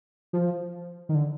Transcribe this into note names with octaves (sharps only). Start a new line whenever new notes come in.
F3
D#3
D3